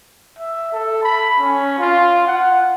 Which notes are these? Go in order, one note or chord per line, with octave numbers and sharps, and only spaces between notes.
E5
A4
B5
C#4
F4
F#5